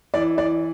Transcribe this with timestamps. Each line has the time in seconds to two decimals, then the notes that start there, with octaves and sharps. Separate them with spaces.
0.14 E3 D5
0.37 E3 D5